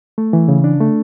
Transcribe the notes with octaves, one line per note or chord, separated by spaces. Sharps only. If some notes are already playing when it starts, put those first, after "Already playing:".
A3
E3
C#3
D4
A3